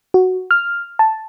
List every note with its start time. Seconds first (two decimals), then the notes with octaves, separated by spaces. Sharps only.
0.14 F#4
0.51 F6
0.99 A5